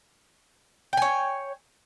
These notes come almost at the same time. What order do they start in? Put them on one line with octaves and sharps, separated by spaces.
G5 G#5 C#5